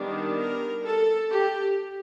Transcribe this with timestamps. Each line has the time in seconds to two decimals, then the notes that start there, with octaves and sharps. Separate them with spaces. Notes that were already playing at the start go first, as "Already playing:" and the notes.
Already playing: D#3 G3 B3 D4
0.38 A#4
0.85 A4
1.31 G4